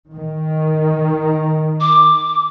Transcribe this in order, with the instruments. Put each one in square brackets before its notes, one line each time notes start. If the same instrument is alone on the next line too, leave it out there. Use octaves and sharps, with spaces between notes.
[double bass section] D#3
[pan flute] D6